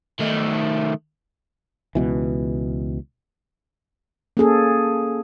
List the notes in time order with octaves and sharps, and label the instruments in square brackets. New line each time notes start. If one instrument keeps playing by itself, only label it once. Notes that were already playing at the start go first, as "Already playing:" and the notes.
[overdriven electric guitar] D#3 A3
[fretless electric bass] C#2 B2 E3
[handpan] A#3 C#4 G#4 A4